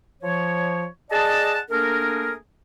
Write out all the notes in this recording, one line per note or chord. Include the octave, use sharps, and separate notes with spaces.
F3 C#5
G#4 D5 D#5 F#5 A5
A3 A#3 D4 G#4 A#4